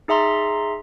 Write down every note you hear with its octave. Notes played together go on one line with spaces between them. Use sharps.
D#4 G#4 E5 A#5 C6